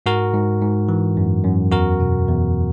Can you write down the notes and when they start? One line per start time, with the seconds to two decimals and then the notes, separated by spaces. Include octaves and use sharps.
0.06 G#2 F#4 A#4
0.34 G#2
0.62 G#2
0.89 E3
1.17 F#2
1.45 F#2
1.72 E2 F#4 A#4
2.00 B2
2.28 E2